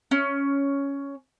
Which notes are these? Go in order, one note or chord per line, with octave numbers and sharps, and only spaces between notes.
C#4